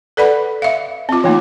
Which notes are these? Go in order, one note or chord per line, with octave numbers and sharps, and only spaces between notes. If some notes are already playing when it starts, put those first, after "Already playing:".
A4 B4 D5 F#5 B5
E5 F5
C4 F4
E3 A3 A#3 D#4